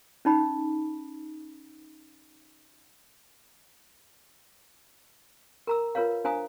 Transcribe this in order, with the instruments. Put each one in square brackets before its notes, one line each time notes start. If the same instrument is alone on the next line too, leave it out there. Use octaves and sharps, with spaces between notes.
[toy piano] C#4 D#4 B5
A#4 A#5 E6
F4 A#4 B4 C#5 F5
D4 C5 F5 G#5 A#5 D#6